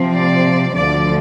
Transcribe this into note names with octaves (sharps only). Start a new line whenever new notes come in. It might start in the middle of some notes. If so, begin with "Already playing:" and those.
Already playing: C3 F3 C4
D5
D2 D3 F3 D5